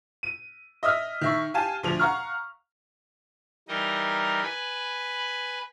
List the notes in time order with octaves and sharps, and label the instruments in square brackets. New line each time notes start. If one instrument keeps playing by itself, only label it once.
[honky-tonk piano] D#7
D#5 E5 D#6 F6
D#3 E5 C#6
G4 F5 G#5 A5
D2 F3 F7
F5 F#5 A#5 C#6 F6
[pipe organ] E3 G3 D#4 A#4 D#5
B4 G#5 B5